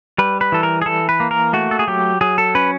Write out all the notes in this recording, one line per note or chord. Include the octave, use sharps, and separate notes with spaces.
G3 B4
B4
E3 A4
A#4
G#4
E3 A4
B4
A#3
A#4
A3 F#4
A4
G#4
F#3 G4
F#3 G#4
A4
C#4 B4